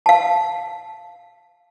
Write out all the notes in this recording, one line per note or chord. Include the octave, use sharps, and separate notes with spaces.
F5 A5